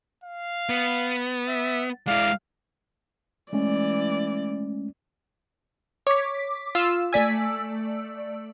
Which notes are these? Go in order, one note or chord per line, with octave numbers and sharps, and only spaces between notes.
F5
B3
E5
G#3 E4 D5 F5
E3 G#3 A3 C#4 D5
C#5 D6 B6
F4 E6
A3 D5 G#5 E6 B6